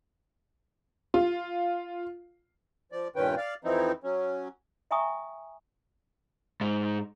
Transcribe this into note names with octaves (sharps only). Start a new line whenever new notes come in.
F4
F3 D5
G2 A#2 D#3 C#4 B4 G5
D5 F5
F2 E3 F3 C4 D#4 E4
F#3 C#4
E5 G5 G#5 A#5 C#6 D#6
G#2